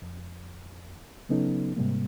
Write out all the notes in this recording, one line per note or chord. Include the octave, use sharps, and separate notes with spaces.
F2
C#3 F#3 B3 C#4 D#4 A4
G#2 C3 G3 A#3